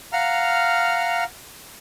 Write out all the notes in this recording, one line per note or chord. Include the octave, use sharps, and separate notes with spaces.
F5 F#5 A#5 F6